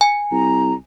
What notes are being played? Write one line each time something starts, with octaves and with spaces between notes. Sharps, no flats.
G#5
C2 A#5